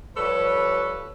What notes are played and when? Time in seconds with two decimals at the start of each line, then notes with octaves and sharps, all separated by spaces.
0.17 F3 G3 A4 B4 C#5